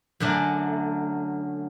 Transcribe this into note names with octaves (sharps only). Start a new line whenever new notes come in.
F#2 D3 F#3 A3 D4